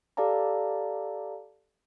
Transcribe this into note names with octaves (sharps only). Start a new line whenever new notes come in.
G4 A4 D5 F5 A5 A#5